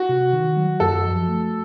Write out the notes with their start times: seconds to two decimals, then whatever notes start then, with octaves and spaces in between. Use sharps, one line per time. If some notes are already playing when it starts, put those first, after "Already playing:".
Already playing: F#4
0.09 C3
0.33 D#3
0.57 F#3
0.80 F#2 A4
1.04 F3
1.28 A3